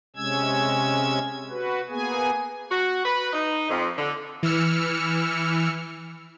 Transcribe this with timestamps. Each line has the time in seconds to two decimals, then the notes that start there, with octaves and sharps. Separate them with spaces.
0.16 C3 G#3 C#4 E6 G#6
1.50 F#4 B4
1.90 A#3 B3 G#4 G#5
2.70 F#4
3.05 B4
3.33 D#4
3.70 F2
3.97 D3
4.43 E3 E6 F6 C#7